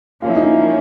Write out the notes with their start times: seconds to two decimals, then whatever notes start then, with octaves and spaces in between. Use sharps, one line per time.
0.22 F3 A#3 C#4 F4
0.29 E4
0.36 D#4
0.43 E4